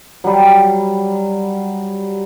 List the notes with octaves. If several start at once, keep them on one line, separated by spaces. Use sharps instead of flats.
F#3 G3